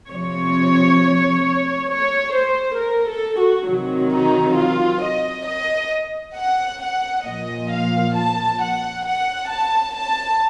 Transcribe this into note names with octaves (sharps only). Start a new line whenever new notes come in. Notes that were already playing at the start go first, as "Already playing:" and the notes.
C3 F3 C#5
C#5
C5
A#4
A4
F#4
C3 D#3 F#3
D#4
F4
D#5
D#5
F#5
F#5
A#2 F3 D#5
F5
A5
F#5
F#5
A5
A5